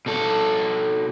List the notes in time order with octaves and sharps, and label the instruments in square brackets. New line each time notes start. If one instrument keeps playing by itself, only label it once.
[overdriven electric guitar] B2 A4